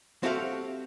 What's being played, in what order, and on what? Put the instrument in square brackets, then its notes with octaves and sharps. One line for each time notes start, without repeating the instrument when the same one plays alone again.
[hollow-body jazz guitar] C4 F#4 G4 A4 E5 F5